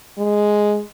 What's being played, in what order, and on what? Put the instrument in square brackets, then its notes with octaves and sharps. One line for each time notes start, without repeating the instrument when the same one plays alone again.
[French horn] G#3